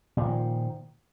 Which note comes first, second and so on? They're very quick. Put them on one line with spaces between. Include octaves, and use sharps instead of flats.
A#2 D#3 F3